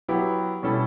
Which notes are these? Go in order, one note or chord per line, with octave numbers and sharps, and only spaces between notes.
F#3 B3 E4 G4
B2 G3 C#4 E4 A4